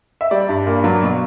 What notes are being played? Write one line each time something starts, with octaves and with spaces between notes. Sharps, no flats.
E5
G3 D5
G2
A#2
F#3
B2